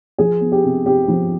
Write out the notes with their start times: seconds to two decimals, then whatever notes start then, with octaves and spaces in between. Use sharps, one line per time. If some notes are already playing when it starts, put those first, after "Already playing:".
0.18 F3 G#4
0.41 B3
0.52 G4
0.64 C3
0.85 C3 G4
1.08 F3